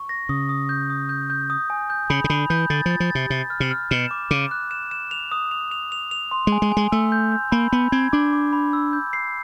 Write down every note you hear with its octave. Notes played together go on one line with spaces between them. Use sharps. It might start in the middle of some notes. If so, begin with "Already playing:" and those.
Already playing: C#6
A#6
C#3 D#6
D#6
G6
D#6
G6
G6
D#6
G#5
G6
C#3 B5
C#3
D3 B5
E3 G6
D3 A6
F3
A6
F3
C3 A6
C3 A6
F6
C3
F6
B2 E7
D6
C#3 D6
F#6
E7
E7
F7
D#6
F7
F7
F7
F7
C6
G#3
G#5
G#3
G#5
G#3
A3 E6
G6
G6
A#3 B5
B3 B5
C4 G#6
D4 D6
D6
B5
E6
G6
C7